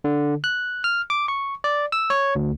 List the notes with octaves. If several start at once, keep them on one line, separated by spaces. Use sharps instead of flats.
D3
F#6
F6
D6
C#6
D5
E6
C#5
D2